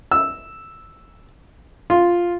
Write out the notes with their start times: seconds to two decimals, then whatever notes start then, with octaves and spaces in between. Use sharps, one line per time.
0.11 E6
1.90 F4